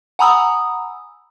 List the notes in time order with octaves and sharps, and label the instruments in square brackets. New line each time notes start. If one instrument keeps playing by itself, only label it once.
[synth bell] F#5 G#5 A#5 B5 D#6 E6